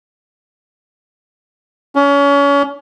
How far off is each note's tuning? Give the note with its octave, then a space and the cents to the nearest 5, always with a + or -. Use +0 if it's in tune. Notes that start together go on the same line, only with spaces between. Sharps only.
C#4 +30